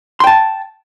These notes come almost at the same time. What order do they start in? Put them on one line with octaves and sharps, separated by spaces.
C6 G5 A5